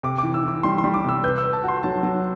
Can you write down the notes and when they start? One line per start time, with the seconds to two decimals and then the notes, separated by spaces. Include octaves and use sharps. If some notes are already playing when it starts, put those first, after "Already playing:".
0.03 C3 D6
0.18 E3 D6
0.34 E6
0.44 E3 D6
0.63 G3 C6
0.78 C6
0.84 G3
0.94 D6
1.04 C3 E6
1.24 B4 G6
1.38 E6
1.43 B4
1.53 A5
1.63 F#4 C6
1.83 F#3 A5
2.03 F#3